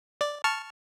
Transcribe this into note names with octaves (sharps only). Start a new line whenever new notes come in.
D5
A5 C#6 F6